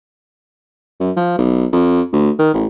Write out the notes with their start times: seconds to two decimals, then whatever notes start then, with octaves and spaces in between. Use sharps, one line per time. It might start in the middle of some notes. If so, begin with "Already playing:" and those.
1.00 F#2
1.17 F3
1.38 B1
1.73 F2
2.13 D2
2.39 D#3
2.54 A1